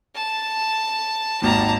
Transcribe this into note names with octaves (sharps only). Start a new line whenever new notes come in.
A5
G#1 D#2 A5 A#5